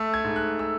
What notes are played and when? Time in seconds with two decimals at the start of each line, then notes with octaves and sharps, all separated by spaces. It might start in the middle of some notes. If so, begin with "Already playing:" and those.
Already playing: A3 E6
0.14 G#6
0.24 G#2
0.36 F#6
0.59 E6